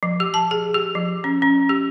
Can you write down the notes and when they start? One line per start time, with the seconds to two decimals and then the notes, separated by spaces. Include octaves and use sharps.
0.03 F3
0.20 G4
0.34 A5
0.51 G#4
0.74 G4
0.95 F3
1.24 C#4
1.42 C#4
1.69 G4